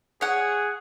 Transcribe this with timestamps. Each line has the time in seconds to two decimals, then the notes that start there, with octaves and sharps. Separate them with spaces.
0.21 G#4 C#5 F#5